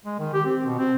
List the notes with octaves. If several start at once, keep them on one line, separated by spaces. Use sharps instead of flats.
G#3
D#3
G4
C4
B2
C4